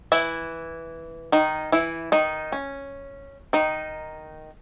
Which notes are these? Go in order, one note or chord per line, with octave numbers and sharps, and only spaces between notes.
E3 E4
D#3 D#4
E3 E4
D#3 D#4
C#4
D#3 D#4